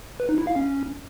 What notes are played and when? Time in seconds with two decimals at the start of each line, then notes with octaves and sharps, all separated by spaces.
0.20 B4
0.29 D#4
0.38 E4
0.47 F5
0.56 C#4